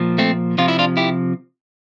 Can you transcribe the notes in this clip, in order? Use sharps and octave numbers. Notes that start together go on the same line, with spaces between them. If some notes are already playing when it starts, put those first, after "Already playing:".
Already playing: A#2 F3
A3 C4
C3 F3 F4
E4
D4 F4
E4 G4